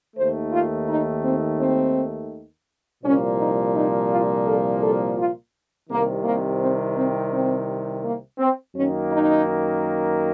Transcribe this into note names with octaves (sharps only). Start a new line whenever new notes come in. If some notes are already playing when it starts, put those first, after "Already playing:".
D#2 D#3 A3 C5
F4
D#4
C4
C4
C2 A#2 F3 A#3 C#4
D#4
D#4
F4
A4
A4
F4
C2 C3 D#3 A#3
A#3
C4
C4
C4
A#3
C4
F#2 D#3 A#3 C#4
D#4